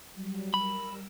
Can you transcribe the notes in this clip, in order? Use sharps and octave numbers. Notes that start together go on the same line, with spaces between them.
F#3 G3
G3 A#4 B5 E6